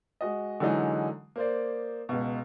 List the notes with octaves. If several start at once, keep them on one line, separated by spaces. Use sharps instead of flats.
G#3 F#4 D#5
D3 E3 F#3 G#3 D#4
A#3 C5 D5
C#2 B2